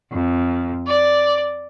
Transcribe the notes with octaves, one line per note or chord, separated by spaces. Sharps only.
F2
D5